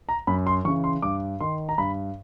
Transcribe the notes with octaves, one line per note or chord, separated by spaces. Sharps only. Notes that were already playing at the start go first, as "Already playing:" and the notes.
A#5
F#2 B5
C6
C#3 E3 C#6
C6
G2 D6
D#3 C6
A#5
G2 B5